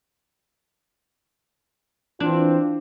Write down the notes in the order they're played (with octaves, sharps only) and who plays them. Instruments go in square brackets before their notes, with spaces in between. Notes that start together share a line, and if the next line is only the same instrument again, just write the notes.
[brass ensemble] E3 C4 F4 [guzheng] D4